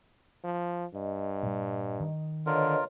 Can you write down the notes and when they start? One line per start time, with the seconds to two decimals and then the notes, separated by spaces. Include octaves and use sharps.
0.44 F3
0.95 G2 D#5
1.43 A#2 G3
2.00 D#3
2.46 D3 F4 A#4 B4 C#5 D#5